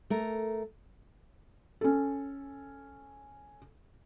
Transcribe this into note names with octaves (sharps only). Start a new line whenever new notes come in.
A3 A#4
C#4 A4